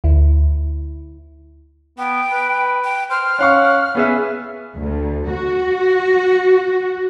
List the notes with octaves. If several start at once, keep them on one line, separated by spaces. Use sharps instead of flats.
D2 E4
B3 G5
B4
G5
C5 F6
C#4 F5 F#5 C#6
B3 C#4 G#4 E5
D2
F#4